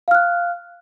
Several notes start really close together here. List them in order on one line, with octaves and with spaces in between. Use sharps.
F5 F6 F#6